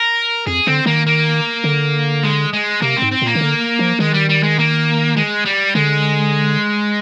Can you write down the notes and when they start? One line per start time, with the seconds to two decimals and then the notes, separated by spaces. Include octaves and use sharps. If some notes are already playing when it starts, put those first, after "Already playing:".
Already playing: A#4
0.47 F2 G#4
0.67 D3 C4
0.86 D#3 A#3
1.06 A#3
1.64 D3
2.24 G#3
2.53 G#3
2.81 C3 A#3
2.96 C4
3.02 G#2
3.11 C4
3.22 A#2 A#3
3.35 D#3
3.41 D3
3.79 F3
3.99 D#3 G#3
4.14 G3
4.29 G3
4.43 G#3
4.59 A#3
5.17 G#3
5.46 G3
5.75 D3 G#3